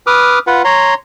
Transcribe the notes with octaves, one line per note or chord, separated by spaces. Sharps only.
B4 D6 D#6 F6
F4 B4 F#5
C#5 A#5 C6